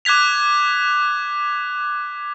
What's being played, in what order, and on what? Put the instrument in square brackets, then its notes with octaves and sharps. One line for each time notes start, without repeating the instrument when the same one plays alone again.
[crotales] D6 F#6 G#6 B6 F7